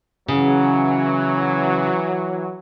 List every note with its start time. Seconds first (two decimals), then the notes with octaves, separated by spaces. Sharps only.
0.28 C#3 E3 F#3